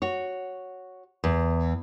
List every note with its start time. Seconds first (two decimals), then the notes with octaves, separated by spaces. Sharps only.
0.02 F#4 C#5
1.24 E2